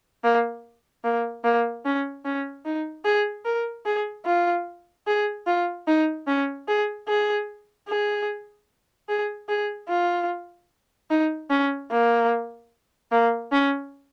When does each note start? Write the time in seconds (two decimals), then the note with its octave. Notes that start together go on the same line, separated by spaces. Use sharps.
0.24 A#3
1.04 A#3
1.44 A#3
1.85 C#4
2.25 C#4
2.65 D#4
3.05 G#4
3.45 A#4
3.86 G#4
4.25 F4
5.06 G#4
5.47 F4
5.87 D#4
6.27 C#4
6.68 G#4
7.08 G#4
7.89 G#4
9.09 G#4
9.49 G#4
9.89 F4
11.10 D#4
11.50 C#4
11.91 A#3
13.12 A#3
13.52 C#4